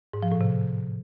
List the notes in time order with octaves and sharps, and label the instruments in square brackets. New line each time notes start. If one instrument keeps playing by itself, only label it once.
[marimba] G#2
F3
A2
C3